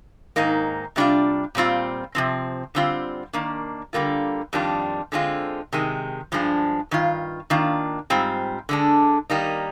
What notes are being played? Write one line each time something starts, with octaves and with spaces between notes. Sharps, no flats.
G#2 D#3 A#3 D#4
C3 G3 D4 F4
A#2 G3 C4 F4
C3 F3 C4
D3 G3 C4 F4
D#3 A#3 D4
D3 G3 A#3 F4
F2 D#3 G3 D4 F4
D3 G#3 C4 F4
C3 D#3 G#3
G2 F3 G#3 D4
G2 D#3 F4
D#3 A#3 D4 F4
G#2 G3 C4 F4
D3 G#3 D4
D#3 G3 A#3 D#4